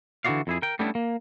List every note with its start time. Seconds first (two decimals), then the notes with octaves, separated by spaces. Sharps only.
0.25 D3 E3 E4 F#4 D5 F5
0.47 F2 E4 G#4
0.62 A#4 G5
0.79 G3 A3 B3 C#4 D4 E4
0.95 A#3